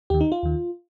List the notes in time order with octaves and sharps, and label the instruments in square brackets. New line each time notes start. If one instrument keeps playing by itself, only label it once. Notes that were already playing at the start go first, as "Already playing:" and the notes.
[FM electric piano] D#2 D#3 G4
D#4
F4
D#2 D#3